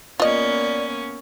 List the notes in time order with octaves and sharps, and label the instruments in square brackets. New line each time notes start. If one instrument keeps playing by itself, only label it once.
[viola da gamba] A#3 B3 C#4 [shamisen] F4 D#5 [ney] D5